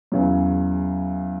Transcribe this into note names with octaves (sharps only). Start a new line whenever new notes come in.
E2 C#3 F#3